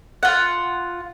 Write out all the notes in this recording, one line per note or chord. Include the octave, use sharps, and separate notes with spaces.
F4 F#5